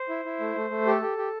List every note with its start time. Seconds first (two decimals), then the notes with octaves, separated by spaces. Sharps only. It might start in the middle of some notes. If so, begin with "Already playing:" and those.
Already playing: C5
0.09 E4
0.25 E4
0.40 A3
0.56 A3
0.70 A3
0.86 G4 A4
1.02 G4
1.17 G4